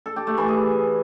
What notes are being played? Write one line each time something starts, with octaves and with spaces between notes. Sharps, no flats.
A4
G4
A3
E3
G#4